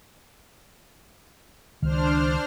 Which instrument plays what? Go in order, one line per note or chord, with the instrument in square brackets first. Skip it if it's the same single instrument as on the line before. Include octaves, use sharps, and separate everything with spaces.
[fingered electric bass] C#2 D#3 [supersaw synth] D4 C5 F6